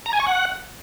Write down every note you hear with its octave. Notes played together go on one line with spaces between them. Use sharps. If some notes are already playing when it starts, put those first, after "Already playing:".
A#5
G#5
C#6
F#5